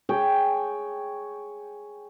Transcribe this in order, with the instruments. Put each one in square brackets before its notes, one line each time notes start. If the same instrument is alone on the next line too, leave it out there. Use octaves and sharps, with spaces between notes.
[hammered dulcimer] G#4 C#5 G5